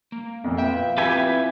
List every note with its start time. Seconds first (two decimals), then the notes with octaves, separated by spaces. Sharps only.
0.12 A#3
0.44 F2 A#2
0.58 F4 B4 E5 G5
0.98 C4 E4 F4 G4 B4 G#5 E6